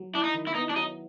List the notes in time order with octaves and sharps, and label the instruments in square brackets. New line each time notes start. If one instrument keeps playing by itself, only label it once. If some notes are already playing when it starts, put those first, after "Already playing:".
Already playing: [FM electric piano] F#3
[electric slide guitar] D4 [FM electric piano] E4
[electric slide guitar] D#4
[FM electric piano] D#3
[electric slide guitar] E4
[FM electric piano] B3 [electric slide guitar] D#4
[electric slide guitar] D4
[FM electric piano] F#3 [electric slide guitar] D#4